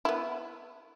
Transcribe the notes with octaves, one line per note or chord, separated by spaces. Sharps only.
B3 E4